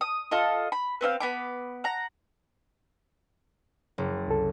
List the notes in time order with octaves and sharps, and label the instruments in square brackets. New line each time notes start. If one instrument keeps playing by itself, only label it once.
[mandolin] D#6
F4 A4 D#5
B5
B3 C4 D#5 F5
B3 B5 D6
F#5 A#5
[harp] F#1
[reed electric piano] C2 A4